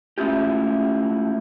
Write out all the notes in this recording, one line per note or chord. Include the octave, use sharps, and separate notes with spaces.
G#3 A3 C#4 E4 F4 G4